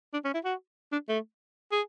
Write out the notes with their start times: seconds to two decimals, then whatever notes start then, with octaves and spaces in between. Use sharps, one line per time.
0.13 D4
0.24 C#4
0.34 E4
0.45 F#4
0.92 D4
1.09 A3
1.72 G#4